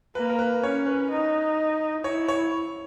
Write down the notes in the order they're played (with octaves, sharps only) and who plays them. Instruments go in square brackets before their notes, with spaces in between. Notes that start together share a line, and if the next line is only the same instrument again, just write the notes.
[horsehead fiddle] A#3 [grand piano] B4
[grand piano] A#4
B4
[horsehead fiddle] C#4 [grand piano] C#5
[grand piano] B4
[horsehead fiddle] D#4
[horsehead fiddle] E4 [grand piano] C#5
[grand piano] C#5